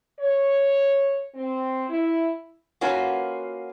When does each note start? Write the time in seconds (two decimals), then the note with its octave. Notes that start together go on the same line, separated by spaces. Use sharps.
0.20 C#5
1.35 C4
1.89 E4
2.81 A#3 C#4 F4 F#4 B4